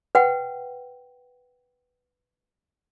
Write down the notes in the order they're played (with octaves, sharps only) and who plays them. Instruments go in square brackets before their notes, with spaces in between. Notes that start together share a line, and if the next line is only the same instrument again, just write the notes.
[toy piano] B4 F#5 G5